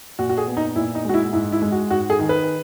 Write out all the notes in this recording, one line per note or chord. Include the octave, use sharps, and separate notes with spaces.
A#2 F#4
F#4
G#4
B3
D#4
A#2 E4
D#4
G#3 F#4
E4
G#2 E4
E4
G#3
F#4
G#2 F#4
G#4
D#3
B4